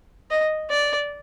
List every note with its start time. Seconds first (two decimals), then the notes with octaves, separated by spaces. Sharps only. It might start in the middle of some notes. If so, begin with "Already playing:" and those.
0.31 D#5
0.71 D5